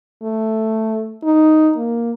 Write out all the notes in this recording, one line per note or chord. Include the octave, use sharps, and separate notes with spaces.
A3
D#4
A#3